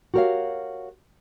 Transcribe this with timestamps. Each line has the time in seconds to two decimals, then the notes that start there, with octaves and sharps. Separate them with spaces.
0.14 F#4 G4 A#4 C5 C#5 F5